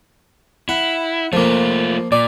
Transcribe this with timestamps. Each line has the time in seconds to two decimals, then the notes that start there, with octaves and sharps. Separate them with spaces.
0.69 E4 F#5
1.33 F3 A3 A#3 F4
2.12 A#2 D5